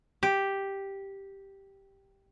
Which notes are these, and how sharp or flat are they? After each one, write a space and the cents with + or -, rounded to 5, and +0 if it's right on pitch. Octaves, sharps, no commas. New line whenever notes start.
G4 +0